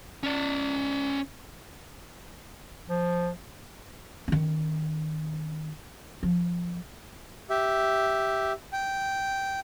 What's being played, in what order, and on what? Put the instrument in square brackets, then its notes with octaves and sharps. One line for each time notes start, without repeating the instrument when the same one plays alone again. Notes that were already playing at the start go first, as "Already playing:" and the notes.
[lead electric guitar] C#4 D5
[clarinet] F3
[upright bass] D#3 C#4
F3
[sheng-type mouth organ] G4 E5
G5